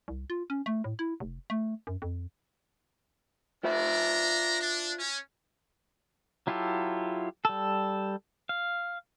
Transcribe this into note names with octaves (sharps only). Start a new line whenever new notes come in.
C2
F4
C#4
A3
A2
E4
F1
A3
F#2
F2
D4 F4 C5 D5 E5 A#5
D4
C#4
F#3 E4 F4 G4 A4
G3 A4
F5